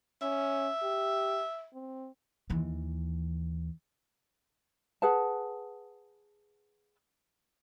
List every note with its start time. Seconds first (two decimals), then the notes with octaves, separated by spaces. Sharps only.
0.22 C#4 E5
0.83 G4
1.74 C4
2.50 D#2 E3
5.02 G#4 B4 F#5 A5